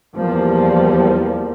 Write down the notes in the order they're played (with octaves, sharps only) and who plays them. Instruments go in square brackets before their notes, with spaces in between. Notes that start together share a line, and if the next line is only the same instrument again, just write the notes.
[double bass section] E2 F3 G3 A#3